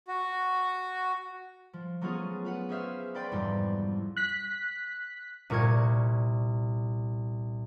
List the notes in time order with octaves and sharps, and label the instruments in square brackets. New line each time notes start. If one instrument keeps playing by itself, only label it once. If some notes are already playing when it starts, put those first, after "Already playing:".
[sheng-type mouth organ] F#4
[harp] F3
F#3 A3 B3 C#4 F4 G#4
F4 B4 F#5
C#4 G#4 C5 E5 F5
B4 D5 G5 B5 C6
E1 F2 G#2 G3 C6
[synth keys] F#6 B6
[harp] C2 A#2 A#4 C#6 G#6